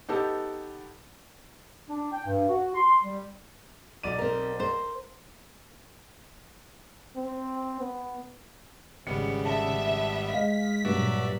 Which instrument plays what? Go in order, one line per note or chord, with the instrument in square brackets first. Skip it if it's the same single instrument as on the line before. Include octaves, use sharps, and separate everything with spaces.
[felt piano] B3 D#4 G4 A4
[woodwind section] D4
G5
G2
F#4
C6
G3
[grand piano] B1 D5 D#7
[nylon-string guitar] C4 A#4
A#4 C5
[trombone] C4
B3
[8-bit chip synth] G#1 G3 B3 [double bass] C#3 [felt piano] C#7
[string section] E5 [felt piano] A5
[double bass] G#3 [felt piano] D#5 F5 [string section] B6
[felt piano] G2 [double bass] A#2 F#3 [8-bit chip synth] F#4 D5 E5